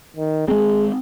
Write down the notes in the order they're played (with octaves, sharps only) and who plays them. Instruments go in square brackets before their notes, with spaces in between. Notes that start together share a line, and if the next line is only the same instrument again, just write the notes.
[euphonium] D#3
[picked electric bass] G#3 C4 [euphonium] G#4